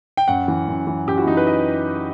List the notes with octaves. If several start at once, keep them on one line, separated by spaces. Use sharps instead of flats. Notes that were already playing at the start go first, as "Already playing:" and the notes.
G5
F#2 F#5
E3
F#2
E3
F#2 G4
F#4
E4
E3 D#4
B4
D#5